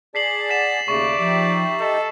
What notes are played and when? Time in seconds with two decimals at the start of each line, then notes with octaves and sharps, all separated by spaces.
0.15 G#4 D5 A5 B6 C7 F#7
0.49 F#5 A6 B6 E7
0.88 D#2 C#3 A3 G#4 D5 C#6
1.18 F3 D#4 G4 E5
1.80 A4 D#5